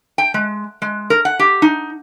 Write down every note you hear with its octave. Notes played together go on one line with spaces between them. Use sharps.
G5
G#3
G#3
A#4
F#5
G4
D#4